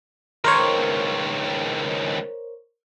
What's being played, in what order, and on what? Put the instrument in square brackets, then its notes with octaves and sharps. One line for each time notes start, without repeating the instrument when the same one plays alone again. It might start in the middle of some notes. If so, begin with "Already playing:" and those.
[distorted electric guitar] C#2 D#3 [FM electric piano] A#4 C5 C#5